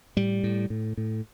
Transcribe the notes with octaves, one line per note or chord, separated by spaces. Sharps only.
A2 G3
A2
A2
A2